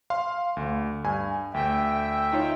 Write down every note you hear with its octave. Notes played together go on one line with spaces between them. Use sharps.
F5 C6
D2
G2 G#5
D2 E5 G5
D#4 F4 C#5